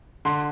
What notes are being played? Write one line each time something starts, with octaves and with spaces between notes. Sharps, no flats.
D3 C6